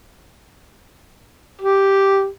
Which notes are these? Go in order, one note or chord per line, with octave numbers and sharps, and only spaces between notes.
G4